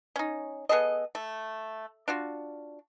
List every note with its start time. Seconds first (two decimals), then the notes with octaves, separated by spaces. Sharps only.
0.16 C#4 D#4
0.69 B3 G#4 A4 D#5
1.15 A3
2.08 D4 F4 F#4